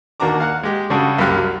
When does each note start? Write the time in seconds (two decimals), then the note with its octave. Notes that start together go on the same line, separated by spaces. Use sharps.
0.20 D#2 A#3 D4 F#4 A#5 D6
0.40 F5 F#5 F#6
0.63 G#3 G4
0.90 C#3 G3 D4 F#4 G#4 A4
1.18 C2 F#2 G3 G4 F5 F#6
1.36 F#3